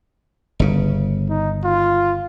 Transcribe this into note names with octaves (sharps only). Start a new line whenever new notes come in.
G1 C#3
D#4
F4